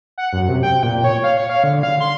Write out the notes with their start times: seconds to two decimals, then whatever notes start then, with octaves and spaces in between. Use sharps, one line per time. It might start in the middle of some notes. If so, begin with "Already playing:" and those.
0.18 F#5
0.33 F#2
0.49 C3
0.63 G5
0.83 A#2
1.04 C#5
1.24 F5
1.37 C#5
1.50 F5
1.64 D3
1.83 F5
2.00 C6